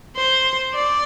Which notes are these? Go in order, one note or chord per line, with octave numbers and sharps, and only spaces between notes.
C5
D5